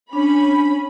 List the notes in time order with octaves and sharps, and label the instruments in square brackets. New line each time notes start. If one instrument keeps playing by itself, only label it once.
[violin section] C#4 B5 [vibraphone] D4